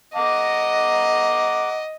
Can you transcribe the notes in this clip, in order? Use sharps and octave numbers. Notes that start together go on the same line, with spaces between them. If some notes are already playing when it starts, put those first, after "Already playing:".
D#5 F#5 A#5 D6